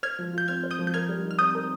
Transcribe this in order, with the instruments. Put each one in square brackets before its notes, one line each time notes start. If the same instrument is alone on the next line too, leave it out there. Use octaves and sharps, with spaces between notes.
[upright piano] C5 [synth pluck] F6 G#6
[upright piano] F3
[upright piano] F4 [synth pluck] G6
[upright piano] C4 [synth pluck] F6 G#6
[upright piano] C5
[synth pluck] D#6 G6
[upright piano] F3
[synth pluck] G6
[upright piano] A#4 [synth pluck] F6 G#6
[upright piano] G3
D#4
[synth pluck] F6
[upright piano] C4 [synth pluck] D#6 G6
[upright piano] A#4